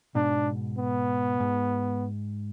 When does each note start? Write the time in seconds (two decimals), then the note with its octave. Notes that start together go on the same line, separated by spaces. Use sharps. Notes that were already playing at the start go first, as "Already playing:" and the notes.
0.15 G#2 B2 D4
0.78 B3
1.40 G#2